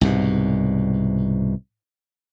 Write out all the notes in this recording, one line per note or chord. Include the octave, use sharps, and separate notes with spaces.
C2 G#2 B2